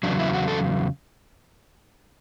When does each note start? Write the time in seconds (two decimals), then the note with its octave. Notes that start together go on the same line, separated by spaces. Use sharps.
0.03 E2 C#3 F#3 D4
0.19 E4
0.33 F#4
0.48 A4